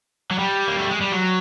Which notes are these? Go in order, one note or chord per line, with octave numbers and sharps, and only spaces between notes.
F#3
G3
A#3
A3
G#3
G3
F#3